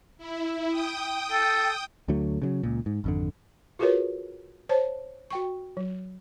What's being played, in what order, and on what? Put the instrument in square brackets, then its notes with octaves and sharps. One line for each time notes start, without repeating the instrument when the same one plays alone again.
[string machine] E4
G5 D#6
[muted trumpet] A4
[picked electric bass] D2 D3 F#3 A3
C#3 E3 F#3
C#2 A#2
G#2
G#1 F2 D3
[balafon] F4 F#4 G#4 A#4 B4 C#5
C5 C#5 A5
F#4 G5 C#6
F#3